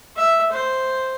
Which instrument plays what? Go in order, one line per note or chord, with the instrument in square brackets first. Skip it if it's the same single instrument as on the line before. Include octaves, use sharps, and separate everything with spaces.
[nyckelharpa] E5
C5